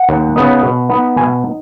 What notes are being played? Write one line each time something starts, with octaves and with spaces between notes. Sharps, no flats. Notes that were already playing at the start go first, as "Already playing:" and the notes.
Already playing: F#5
D#2
C#3 B3 D#4
B2
B3 D#4
B2 G#5
D#4